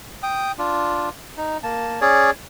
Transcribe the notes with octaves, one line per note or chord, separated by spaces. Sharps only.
G5 D#6
D4 F4
D#4
A#3 A5
C#4 G#4 C#5 D5